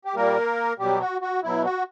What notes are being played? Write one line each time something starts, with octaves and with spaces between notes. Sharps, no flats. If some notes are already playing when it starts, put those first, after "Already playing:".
G4
A#2 G3 A#3 A#4
B2 F#3 G3 G4
F#4
F#4
B2 F#3 E4
F#4